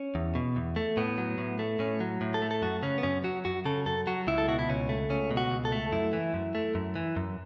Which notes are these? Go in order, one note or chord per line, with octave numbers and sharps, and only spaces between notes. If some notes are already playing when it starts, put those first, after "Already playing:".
Already playing: C#4
E2
B2
E2
A3
A2 B3
F#3
A2
A3
A2 C#4
F#3
A2
A4
A3
A4
F#2 F#4
C#3 C#4
B3
F#2 C#4
F#3 F#4
F#2 F#4
C#3 A4
F#2 A4
F#3 F#4
C#2 E4
A4
B2 F#4
E4
C#2 C#4
A3
C#2 C#4
B2
F#4
C#2
A4
A3
F#2 E4
E3
F#2
A3
F#2
E3
F#2